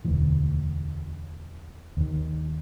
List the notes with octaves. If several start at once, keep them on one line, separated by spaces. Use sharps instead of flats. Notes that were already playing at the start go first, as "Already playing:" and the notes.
E1 D2 E3
D#2 D#3